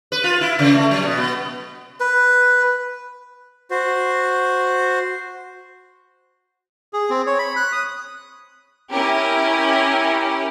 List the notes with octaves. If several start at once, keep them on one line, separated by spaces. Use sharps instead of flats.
B4
F4
E4
C#3
A3
F#3
B2
B3
B4
F#4 C5
G#4
C4
C#5
B5
F#6
D#6
C#4 E4 G4 A#4